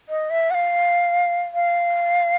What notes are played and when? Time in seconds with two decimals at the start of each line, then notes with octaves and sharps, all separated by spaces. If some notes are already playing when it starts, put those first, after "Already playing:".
0.09 D#5
0.30 E5
0.51 F#5
0.55 F5
1.54 F5